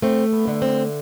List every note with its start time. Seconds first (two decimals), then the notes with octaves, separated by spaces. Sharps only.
0.02 A3 C4
0.33 B3
0.47 D3
0.62 C4